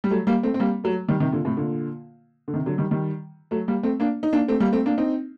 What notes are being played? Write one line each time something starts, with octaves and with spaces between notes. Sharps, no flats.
G3
F#3 A3
G3 A#3
A3 C4
C4
G3 A#3
F#3 A3
D#3 G3
C3 D#3
A#2 D3
A2 C3
A#2 D3
D3
C3 D#3
D3 F#3
D#3 G3
D#3 G3
F#3 A3
G3 A#3
A3 C4
A#3 D4
D#4
A#3 D4
A3 C4
G3 A#3
A3 C4
A#3 D4
C4 D#4